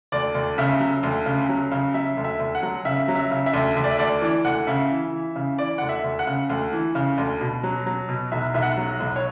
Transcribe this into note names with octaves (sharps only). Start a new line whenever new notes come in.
D2 D5
D2
C#3 E5
F#3
D2
C#3
F#3
C#3
F#3 E5
D2
E5
D2
F#5
F#3
C#3 E5
F#3
E5
C#3
E5
D2
D2 E5
D5
E5
D2 D5
E3 D5
D2 F#5
C#3 E5
E3
E3
C#3
E3 D5
D2 F#5
E5
D2
F#5
C#3
D2
E3
C#3
D2
B2
F#3
F#3
B2
B1 E5
B1 E5
F#5
F#3
B1
C#5